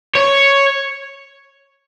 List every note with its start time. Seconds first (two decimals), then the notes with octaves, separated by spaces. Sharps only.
0.15 C#5